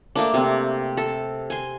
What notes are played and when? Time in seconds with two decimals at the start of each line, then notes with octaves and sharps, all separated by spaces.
0.15 A3 A#3 D4
0.34 C3 C4
0.97 A4
1.50 G#5 C6